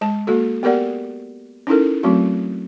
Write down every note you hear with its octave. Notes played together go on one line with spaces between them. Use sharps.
G#3 A5
A#3 F#4 A4
B3 G4 A#4 D5 F#5
C#4 D#4 E4 A4 A#4
F#3 A3 C4 F#4